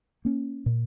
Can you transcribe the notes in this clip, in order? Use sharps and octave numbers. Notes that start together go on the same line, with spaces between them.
A#3 C#4
A#2